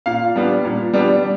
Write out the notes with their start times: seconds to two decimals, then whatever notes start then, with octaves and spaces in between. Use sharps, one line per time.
0.06 A#2 F5
0.36 G3 B3 D4
0.65 A#2
0.93 G3 B3 D4